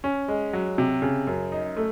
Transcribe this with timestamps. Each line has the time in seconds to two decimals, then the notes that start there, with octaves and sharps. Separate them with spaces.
0.04 C#4
0.28 G#3
0.53 F#3
0.78 C3
1.02 C#3
1.27 F#2
1.52 D#4
1.77 A3